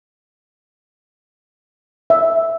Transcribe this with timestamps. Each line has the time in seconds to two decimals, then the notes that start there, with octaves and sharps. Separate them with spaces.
2.10 E5